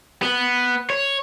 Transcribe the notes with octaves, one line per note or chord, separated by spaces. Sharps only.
B3
C#5